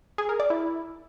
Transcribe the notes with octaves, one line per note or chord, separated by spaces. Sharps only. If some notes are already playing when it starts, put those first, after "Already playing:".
G#4
A#4
D5
E4